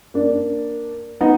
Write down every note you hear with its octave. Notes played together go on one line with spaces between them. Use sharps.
A#3 D4
B3 D#4